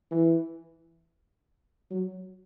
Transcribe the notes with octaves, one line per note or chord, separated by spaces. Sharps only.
E3
F#3